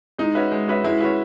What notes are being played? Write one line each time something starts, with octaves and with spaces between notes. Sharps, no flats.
G#3 D#4
C#4 F#4 B4 E5
G#3
C#4 F#4 B4 E5
G#3 E4
C#4 F#4 B4 E5